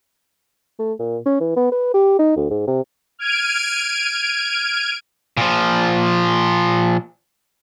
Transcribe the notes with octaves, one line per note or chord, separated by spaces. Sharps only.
A3
A#2
C#4
E3
B3
B4
G4
D#4
D2
G#2
C3
F6 G#6 D7 D#7
A#2 F3